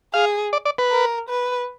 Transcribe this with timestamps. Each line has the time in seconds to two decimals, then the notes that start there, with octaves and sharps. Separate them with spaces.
0.14 G#4 F5
0.53 D5
0.65 D5
0.78 B4
0.91 A#4
1.29 B4